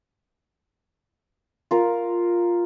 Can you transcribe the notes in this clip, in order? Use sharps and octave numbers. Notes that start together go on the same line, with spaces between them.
F4 A#4